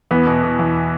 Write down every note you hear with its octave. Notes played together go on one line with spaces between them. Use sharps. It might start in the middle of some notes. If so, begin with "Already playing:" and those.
E2 B3
B2
B2
E2